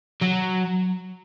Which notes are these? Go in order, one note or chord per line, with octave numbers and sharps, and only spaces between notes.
F#3